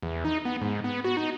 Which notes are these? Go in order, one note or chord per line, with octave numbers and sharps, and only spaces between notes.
E2
D#4
B3
G#2
B3
F#4
D#4